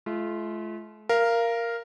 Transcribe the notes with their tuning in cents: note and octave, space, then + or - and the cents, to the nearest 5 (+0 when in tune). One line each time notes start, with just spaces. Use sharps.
A3 -45 F4 -25
A#4 +0 F5 -20